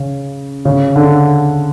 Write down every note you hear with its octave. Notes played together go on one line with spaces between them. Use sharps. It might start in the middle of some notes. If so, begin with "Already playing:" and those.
Already playing: C#3
C#3
D3